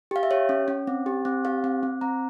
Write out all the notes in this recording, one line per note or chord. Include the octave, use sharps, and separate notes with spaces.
G4 F5
E5
G4 C#5
C#4
C#4
C4
G4
C4
G4 F5
C4
C4
C4 A#5